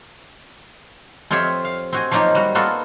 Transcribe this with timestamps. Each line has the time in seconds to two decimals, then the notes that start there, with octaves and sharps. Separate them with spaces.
1.31 F2 C4 F4 G4 C#5 E5
1.64 F5
1.92 C4 F#4 G#5
2.11 F3 F#3 A#3 D#4 F4 G4
2.35 G3 F#4
2.55 A#3 B3 F4 F#4 A4